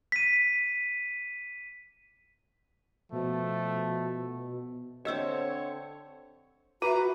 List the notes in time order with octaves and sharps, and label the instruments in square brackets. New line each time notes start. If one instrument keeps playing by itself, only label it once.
[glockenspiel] B6 D#7
[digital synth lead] B2 [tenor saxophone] F3 [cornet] A3
[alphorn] D3 [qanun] C4 E5 [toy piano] G4 D#5 E6 [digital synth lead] C#5
[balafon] F4 E5 [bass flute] F#4 [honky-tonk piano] B4 [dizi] A#5